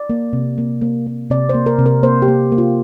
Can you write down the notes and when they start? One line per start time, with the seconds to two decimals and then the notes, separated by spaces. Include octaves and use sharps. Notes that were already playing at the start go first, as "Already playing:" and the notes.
Already playing: D5
0.10 A#3
0.33 C3
0.58 A#3
0.81 A#3
1.06 A#3
1.30 C3 D5
1.49 A#3 C5
1.66 A#4
1.79 C3
1.86 A#4
2.03 A#3 C5
2.22 G4
2.28 A#3
2.52 A#3
2.58 F4